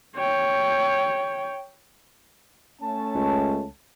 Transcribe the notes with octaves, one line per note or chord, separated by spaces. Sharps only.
C#5 G5
A3 C#4 A5
C#2